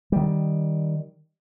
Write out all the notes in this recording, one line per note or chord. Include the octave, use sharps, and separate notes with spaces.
D#3 G3